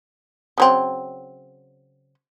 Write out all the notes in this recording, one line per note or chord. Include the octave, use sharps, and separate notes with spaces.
C#3 F#3 C4